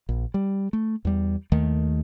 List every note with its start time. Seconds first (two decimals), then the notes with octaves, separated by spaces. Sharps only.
0.09 A#1
0.34 G3
0.73 A3
1.05 E2 G3
1.52 D#2 D#3 A3